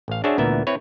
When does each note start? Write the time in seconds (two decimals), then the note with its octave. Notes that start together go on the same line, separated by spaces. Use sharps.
0.08 A1 F5
0.24 D4 F#4 G#4 C5 C#5 E5
0.38 D2 A#2 E3 B3 A#4 E5
0.67 C4 E4 B4 C#5